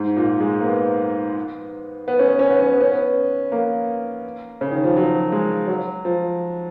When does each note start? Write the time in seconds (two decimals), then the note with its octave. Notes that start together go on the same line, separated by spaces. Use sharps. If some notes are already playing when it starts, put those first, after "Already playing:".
Already playing: G#2
0.16 A#2
0.40 G#3
0.61 A#3
0.65 B3
2.08 B3
2.19 C#4
2.29 B3
2.39 C#4
2.50 B3
2.60 C#4
2.70 B3
2.81 C#4
2.91 B3
3.52 A#3
4.61 C#3
4.72 D#3
4.84 F3
4.97 F#3
5.32 G#3
5.68 F#3
6.05 F3